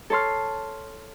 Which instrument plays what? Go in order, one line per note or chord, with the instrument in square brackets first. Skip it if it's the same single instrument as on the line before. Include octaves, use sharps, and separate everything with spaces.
[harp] A4 C#5 A5 C6 F6